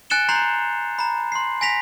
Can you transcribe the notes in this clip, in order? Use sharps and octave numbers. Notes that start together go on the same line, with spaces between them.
G#5 F#6 A6 C#7 E7 G7
A#5 C6 G6 C7 F7
A#5 B5
C6 C7
G#5 A#6 B6 F7